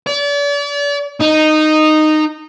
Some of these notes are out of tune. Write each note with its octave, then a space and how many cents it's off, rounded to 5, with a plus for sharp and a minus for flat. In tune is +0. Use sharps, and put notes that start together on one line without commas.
D5 -40
D#4 -10